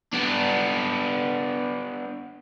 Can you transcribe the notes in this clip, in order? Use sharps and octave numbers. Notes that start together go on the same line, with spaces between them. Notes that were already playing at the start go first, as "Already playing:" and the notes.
B3 D4